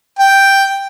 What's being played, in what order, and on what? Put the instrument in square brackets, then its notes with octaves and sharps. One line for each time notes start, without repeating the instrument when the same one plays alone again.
[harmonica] G5